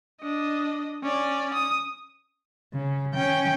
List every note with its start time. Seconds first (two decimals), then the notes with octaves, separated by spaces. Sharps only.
0.22 D4 D#5
1.03 C#4 D5
1.54 D#6
2.74 C#3
3.15 C#4 G5